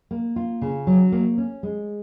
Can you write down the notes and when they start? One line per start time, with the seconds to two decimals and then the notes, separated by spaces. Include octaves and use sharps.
0.11 A#3
0.36 F4
0.62 C#3
0.87 F#3
1.12 A#3
1.38 C#4
1.63 G#3